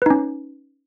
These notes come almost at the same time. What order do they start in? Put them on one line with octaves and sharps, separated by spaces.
B4 D#4 C#4